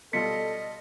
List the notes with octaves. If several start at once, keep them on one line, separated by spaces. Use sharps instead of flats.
B2 G3 F4 A4 D#5 B6 C#7